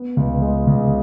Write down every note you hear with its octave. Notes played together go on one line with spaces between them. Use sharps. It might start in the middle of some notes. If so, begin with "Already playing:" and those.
Already playing: B3
C#2
G#3
C#2